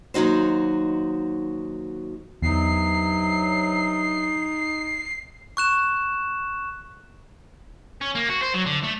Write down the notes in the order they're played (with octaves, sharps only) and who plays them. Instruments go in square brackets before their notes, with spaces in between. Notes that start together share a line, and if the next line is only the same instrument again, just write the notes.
[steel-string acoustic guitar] D#2 F#3 D#4 F#4 C5
[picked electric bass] E2 [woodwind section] G2 C3 F#3 [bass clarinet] D#4 [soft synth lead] C7
[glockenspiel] C#6 F#6 E7
[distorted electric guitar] C#4
A#3
F#4
C5
F#3
D3
A3